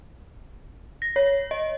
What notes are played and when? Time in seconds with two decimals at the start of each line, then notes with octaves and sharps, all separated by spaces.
1.02 A#6
1.16 C#5
1.51 D#5